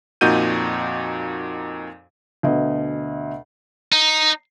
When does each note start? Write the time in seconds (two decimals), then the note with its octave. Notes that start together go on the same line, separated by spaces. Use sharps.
0.21 F2 A#2 D#4 F#4 G6 D#7
2.43 D2 B2 D#5
3.92 D#4